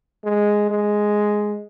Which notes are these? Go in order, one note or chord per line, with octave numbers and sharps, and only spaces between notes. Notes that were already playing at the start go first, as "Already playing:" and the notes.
G#3
G#3